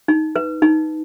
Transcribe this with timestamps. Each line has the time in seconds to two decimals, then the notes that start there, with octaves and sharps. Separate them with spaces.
0.08 D#4
0.36 B4
0.62 D#4